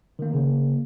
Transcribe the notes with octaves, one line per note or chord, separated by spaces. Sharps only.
D#3 A#3
C#3 A#3